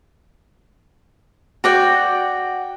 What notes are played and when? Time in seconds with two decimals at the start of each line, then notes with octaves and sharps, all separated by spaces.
1.64 F#4 D5 G5